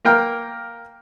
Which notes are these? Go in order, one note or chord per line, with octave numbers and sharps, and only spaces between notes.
A#3 A#4 G5 F6